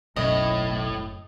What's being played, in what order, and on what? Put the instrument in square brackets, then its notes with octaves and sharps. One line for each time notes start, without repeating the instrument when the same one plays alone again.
[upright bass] F#1 [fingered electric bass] B1 [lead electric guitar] A2 [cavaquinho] D#5